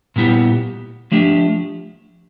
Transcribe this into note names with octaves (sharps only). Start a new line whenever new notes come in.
A#2 G3 B3 E4 G4
F3 A3 D4 G4